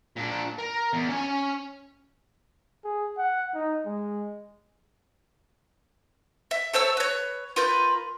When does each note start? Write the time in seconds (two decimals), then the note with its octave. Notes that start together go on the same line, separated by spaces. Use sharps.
0.16 A#2 D4
0.58 A#4
0.93 E2
1.09 C#4 G#5
2.84 G#4
3.17 F#5
3.54 D#4
3.86 G#3
6.51 E5
6.73 A4 C5 C#5 E6
6.97 B4 C#5
7.56 F4 A#4 B4 G6